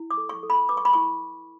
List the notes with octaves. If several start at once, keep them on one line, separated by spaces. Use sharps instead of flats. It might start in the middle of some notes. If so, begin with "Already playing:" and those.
Already playing: E4
D6
A4
C#6
A4
B5
B4 D6
C#6
B5
E4 C#6